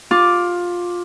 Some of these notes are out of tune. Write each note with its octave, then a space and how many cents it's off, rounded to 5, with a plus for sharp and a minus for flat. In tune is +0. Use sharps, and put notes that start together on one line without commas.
F4 +15 D6 +0